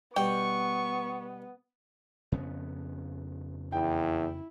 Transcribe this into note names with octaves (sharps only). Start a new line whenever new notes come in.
B2 G3 B3 G5 C#6
F2 C#3 B3
E2 E4 G5